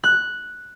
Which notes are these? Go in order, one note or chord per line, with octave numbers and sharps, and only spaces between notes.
F#6